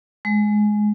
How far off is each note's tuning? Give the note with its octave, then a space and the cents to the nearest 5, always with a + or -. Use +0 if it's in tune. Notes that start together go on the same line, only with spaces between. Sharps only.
G#3 +15